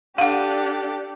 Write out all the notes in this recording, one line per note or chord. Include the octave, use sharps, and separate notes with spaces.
D4 G4 A4 F5 F#5